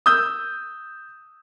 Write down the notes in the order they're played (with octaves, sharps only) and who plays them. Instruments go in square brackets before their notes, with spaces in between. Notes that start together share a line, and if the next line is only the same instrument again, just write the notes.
[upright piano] D#6 E6 G6